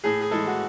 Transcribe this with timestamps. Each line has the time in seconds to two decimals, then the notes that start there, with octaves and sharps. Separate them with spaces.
0.04 A2 G#4
0.21 G#4
0.31 E3 G#3 A4
0.47 F#4